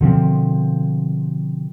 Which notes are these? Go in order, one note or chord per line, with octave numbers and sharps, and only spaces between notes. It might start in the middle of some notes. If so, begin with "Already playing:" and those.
B2 D3 F3 C4